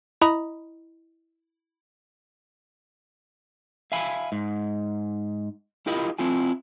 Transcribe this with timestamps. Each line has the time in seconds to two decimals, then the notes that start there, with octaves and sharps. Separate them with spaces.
0.22 E4 D#5 A#5 B5 D#6
3.92 E5 F5 G#5 B5
4.32 G#2
5.87 E4 F4 G4 A#4 D#5 B5
6.19 C4 E4 F4 G#5